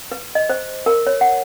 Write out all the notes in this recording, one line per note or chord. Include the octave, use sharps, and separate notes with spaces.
B4
D#5
C5
A#4
C#5
F#5